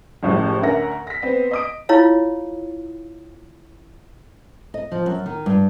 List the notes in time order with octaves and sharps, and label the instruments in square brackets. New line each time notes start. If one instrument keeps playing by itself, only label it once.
[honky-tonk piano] F#1 A2 F3 G4
D2 C#4 A#4 E5 F#5 A#6
A#6 B6
B3 C4
D#5 D#6 D7
[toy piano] E4 F4 C#5 F5
[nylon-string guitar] D#5
F3
F#2
D#3
G2